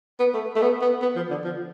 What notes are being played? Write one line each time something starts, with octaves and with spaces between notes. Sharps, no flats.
B3
A3
A3
B3
B3
B3
F3
D3
F3